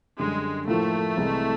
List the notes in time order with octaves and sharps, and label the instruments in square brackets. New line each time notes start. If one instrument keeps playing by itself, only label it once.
[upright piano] F#2 D3 G3 [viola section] G#3
[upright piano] A2 F3 A#3 [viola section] A3
[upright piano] C2 C3 E3 G#3